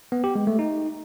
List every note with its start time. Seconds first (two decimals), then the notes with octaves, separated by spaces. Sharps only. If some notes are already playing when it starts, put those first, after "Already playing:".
0.12 B3
0.24 G4
0.35 G#3
0.47 A3
0.59 D#4